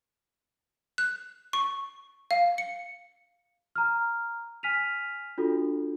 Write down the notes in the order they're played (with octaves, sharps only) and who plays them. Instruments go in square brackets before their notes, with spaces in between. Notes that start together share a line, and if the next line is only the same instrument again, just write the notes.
[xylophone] F#6
C#6
F5
C#7
[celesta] A#5 F6
G#5 F6 B6 D#7 F7
D4 F4 F#4 A4